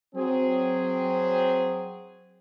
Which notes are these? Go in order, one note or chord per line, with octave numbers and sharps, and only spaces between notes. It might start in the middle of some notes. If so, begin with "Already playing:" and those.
F#3 C4 G#4